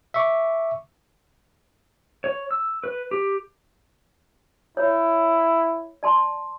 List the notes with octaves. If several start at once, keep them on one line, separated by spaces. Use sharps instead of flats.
E5 C#6 D6
C#5
E6
B4
G4
E4 C#5
D5 A5 C6